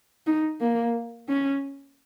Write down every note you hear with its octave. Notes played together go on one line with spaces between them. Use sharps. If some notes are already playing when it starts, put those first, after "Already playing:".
D#4
A#3
C#4